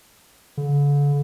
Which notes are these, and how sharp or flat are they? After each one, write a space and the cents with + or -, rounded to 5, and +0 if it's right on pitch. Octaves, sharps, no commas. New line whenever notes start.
D3 -40